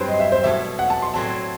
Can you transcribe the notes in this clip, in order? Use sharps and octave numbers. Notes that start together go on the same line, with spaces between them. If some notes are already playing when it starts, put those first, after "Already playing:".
Already playing: G2 F#3 C4 B4 C5
D#5
E5
C5
B2 F#3 A3 E4 E5
F#5
A5
C6
A2 F#3 C4 E4 A5